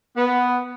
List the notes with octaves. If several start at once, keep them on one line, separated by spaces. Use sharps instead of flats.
B3